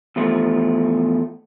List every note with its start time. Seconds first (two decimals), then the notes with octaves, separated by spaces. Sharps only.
0.16 E2 F3 A3